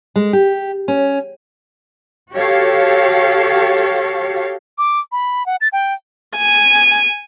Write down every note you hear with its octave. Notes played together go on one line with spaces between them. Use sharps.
G#3
G4
C#4
F#4 G4 A4 C#5 F5
D6
B5
F#5
A6
G5
G#5